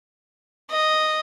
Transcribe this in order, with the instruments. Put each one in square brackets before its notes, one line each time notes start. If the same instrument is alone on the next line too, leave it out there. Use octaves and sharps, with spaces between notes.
[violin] D#5